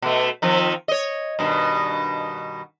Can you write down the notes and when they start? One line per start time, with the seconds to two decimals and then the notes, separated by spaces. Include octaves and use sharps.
0.02 B2 A3
0.42 D#3 F3 C4
0.88 C#5 D#5
1.39 G2 B2 D#3